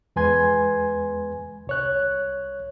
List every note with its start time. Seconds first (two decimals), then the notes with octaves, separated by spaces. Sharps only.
0.16 E2 G#3 B4 G#5 C6 G#6
1.67 C2 C#5 F#6